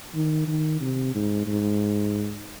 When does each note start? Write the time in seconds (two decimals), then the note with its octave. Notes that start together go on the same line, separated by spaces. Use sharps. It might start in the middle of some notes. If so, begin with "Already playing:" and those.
0.14 D#3
0.47 D#3
0.81 C3
1.15 G#2
1.47 G#2